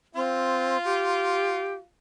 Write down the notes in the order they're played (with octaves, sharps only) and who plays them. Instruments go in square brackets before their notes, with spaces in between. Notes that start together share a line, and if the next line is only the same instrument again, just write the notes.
[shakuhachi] C4 [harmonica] F4
[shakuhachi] G4